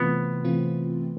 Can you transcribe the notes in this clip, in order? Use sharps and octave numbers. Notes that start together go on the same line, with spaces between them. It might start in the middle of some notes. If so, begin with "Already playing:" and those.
Already playing: C3 E3 A3 B3 C4 F4
C3 E3 A3 C4 F4